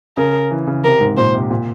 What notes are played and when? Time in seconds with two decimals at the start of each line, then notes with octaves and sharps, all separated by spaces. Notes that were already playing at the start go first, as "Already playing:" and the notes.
0.17 C#3 A#4
0.51 E3
0.67 C#3
0.84 C3 A#4
1.01 G#2
1.17 A#2 C5
1.34 C3
1.50 A#2